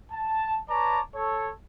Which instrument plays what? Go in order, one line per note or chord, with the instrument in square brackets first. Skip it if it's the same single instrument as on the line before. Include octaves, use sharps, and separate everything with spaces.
[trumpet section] A5
B4 C#5 D5 A5 A#5
A4 C#5